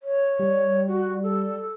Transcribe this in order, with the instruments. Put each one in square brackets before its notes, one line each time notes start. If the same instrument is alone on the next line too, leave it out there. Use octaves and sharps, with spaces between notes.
[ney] C#5
[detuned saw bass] G3
[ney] F#4
A4